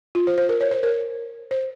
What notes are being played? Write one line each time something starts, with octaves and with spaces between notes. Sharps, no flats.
F4
C5
C5
A#4
C#5
C5
A#4
C5